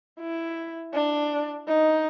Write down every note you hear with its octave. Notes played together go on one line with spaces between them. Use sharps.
E4
D4
D#4